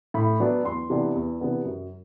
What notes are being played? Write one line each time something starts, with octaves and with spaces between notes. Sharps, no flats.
A2 B5
F#3 B3 D4
E2 C6
C3 E3 B3 D4
E2
C3 E3 B3 D4
F#2